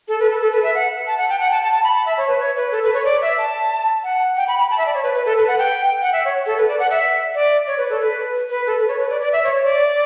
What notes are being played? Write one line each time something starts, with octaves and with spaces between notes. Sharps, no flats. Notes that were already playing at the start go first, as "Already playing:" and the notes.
A4
B4
A4
A4
B4
E5
F#5
A5
F#5
G5
F#5
A5
A5
A5
B5
A5
E5
C#5
B4
C#5
B4
A4
B4
C#5
D5
E5
A5
F#5
G5
B5
B5
A5
E5
D5
C#5
B4
B4
A4
B4
F#5
G5
F#5
E5
C#5
A4
B4
D5
F#5
E5
D5
C#5
B4
A4
B4
B4
A4
B4
C#5
B4
D5
D5
E5
C#5
C#5
D5